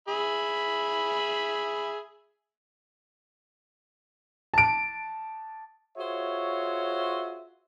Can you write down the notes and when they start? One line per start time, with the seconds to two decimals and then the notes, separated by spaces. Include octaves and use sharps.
0.08 G#4 E5 B5
4.54 A5 D7
5.98 F4 F#4 G#4 C5 C#5 E5